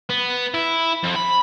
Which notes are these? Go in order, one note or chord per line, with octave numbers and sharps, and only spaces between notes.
B3
E4
F2
B5